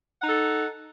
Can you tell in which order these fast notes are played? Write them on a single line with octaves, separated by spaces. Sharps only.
F#5 D#4 A4